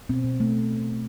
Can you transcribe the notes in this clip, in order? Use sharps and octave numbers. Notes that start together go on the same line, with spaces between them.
B2 C4
B2
A3